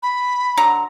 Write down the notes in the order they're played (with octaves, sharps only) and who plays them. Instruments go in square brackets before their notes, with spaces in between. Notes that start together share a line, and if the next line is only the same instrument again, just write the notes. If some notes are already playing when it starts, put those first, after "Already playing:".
[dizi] B5
[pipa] D3 F#3 A#5